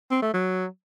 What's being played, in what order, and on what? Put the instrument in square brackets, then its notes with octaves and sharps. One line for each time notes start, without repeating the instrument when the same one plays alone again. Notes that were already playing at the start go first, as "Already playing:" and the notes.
[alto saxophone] C4
A3
F#3